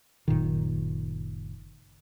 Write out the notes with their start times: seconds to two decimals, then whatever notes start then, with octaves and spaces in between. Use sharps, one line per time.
0.28 F#1 A#2 D#3